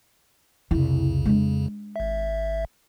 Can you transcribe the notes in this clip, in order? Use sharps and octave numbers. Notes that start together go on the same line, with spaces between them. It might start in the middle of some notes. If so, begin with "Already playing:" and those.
C2 F2 C#3 E4
G#3 D4
G#1 E5